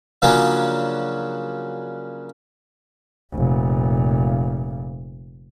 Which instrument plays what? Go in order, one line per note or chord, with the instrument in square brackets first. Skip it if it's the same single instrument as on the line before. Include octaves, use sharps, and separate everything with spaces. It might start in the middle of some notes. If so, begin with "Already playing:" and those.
[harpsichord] C#3 F3 F#3 A#3 C#4 D4
[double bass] F1 A#2